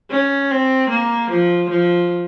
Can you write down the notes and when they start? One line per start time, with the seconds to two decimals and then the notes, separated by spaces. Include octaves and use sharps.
0.10 C#4
0.51 C4
0.89 A#3
1.30 F3
1.69 F3